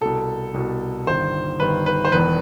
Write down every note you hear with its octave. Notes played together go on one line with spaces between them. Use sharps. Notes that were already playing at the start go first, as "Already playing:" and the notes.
C2 B2 A4
C2 B2
G1 G2 D#3 C5
G1 G2 D#3 B4
B4
C5
E1 E2 D#3 B4